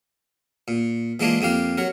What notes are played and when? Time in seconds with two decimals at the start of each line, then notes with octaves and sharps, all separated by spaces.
0.68 A#2
1.20 E3 G#3 A#3 D4 F4
1.41 F2 A#3 G4 F5
1.78 F#3 A#4